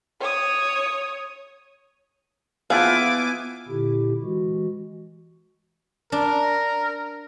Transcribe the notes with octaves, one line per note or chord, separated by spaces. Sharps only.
C#5 D#6
F3 B3 E4 F4 G#4 F5 G#5 D6
A#2 D3 E4 G4
E3 G#3 F#4
D4 A#4